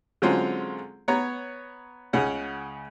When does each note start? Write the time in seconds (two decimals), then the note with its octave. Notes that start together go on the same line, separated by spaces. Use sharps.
0.22 D3 F#3 G#3 C4 C#4 F4
1.08 B3 C#5 A#5
2.13 C#2 C#3 C#4 F#5